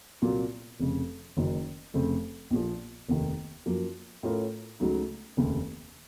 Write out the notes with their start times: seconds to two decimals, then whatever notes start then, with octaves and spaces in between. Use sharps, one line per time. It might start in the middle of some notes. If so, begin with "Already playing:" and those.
0.22 C2 A#2 F#3 A#3 F4
0.80 F1 F2 C#3
1.37 F#1 F#2 D#3
1.94 F1 F2 C#3 A3 C4
2.51 A#1 A#2 F3
3.08 F1 D#2 D#3
3.66 F#2 F3 A#3
4.23 A2 A3 C#4 F4 A#4
4.80 C#2 C#3 F#3 A3 D#4
5.37 F1 D#2 C#3